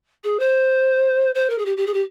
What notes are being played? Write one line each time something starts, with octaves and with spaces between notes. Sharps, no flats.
G#4
C5
C5
A#4
G#4
G4
G4
G#4
G4